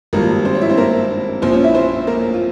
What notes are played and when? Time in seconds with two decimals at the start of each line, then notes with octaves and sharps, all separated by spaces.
0.13 G#1 G2 F3 A#3 A#4
0.45 C4 C5
0.55 C#5
0.61 E4 E5
0.69 C4 C5
0.77 A#3 A#4
1.42 A#1 A#2 F3 C4 C5
1.52 C#4 C#5
1.64 E4 E5
1.75 C4 C5
2.07 A#3 A#4
2.34 F4